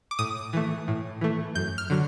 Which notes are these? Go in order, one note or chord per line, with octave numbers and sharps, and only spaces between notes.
D6
A2 D#6
E3 A3
A2
E3 A3
F#2 G6
F6
D3 F#3